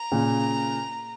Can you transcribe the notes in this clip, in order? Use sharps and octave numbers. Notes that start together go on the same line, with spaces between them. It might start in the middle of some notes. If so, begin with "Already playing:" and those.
Already playing: A#5
A#2 C#3